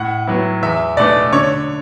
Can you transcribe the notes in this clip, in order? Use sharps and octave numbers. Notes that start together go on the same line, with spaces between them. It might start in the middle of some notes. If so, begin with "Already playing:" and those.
Already playing: A2 F#5
F#3 B3 E4
E2 E5
B2 A3 D4 D5
D3 C#5